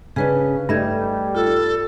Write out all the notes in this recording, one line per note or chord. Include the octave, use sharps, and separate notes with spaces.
C#3 C#4 D4 G#4 B4
G2 G3 A3 D#4 E5 G#6
F4 A4